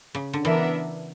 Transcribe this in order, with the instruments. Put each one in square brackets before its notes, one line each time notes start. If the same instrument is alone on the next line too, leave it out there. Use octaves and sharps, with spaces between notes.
[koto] C#3
D3
[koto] E3 [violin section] B3 D4 A#4 E5